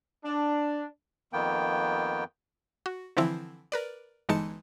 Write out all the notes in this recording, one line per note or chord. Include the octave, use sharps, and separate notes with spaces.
D4
F2 D#3 A#3 B3 G5
F#4
D3 E3 F3 C4 E4
A#4 B4 D5
G1 E3 G#3 D#4 A5 C#7